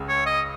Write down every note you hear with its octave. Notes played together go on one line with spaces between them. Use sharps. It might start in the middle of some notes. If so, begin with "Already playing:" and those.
Already playing: C#2 C#3
C#5
D#5